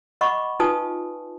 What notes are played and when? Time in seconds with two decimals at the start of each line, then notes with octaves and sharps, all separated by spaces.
0.21 D#5 F#5 B5 C#6 D6
0.60 D#4 F4 B4 G#5 A5 D#6